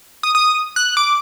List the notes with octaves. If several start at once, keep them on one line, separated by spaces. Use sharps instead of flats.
D#6
D#6
F#6
D6